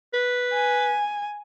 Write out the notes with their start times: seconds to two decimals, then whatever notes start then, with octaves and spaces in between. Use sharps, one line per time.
0.14 B4
0.53 G#5